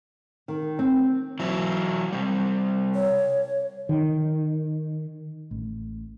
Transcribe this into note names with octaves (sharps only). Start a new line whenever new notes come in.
D#3
C4
E3 F#3 E4
C3 G3
C#5
D#3
A1